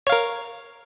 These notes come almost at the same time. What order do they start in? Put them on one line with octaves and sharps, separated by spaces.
C#5 F5 A#4